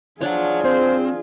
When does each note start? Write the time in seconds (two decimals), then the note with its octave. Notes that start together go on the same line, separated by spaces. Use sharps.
0.21 F3 D4 F4 G#4 C#5 F#5
0.65 C4 C5